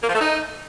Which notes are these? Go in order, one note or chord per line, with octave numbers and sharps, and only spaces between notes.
A#3
F3
A3
D#4